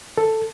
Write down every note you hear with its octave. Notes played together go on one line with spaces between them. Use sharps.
A4